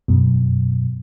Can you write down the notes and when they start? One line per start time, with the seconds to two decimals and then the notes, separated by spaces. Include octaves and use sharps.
0.08 F#2 B2